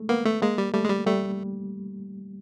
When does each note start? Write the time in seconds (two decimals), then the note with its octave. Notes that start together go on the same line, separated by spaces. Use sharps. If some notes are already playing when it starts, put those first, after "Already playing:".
Already playing: G#3 A3
0.09 A#3 B3
0.25 A3
0.42 G#3 A#3
0.58 G3
0.74 G3 A3
0.85 G#3
0.90 G3
1.06 G3 A3